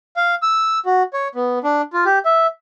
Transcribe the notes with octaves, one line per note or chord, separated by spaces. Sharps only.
F5
E6
F#4
C#5
B3
D4
F4
G4
E5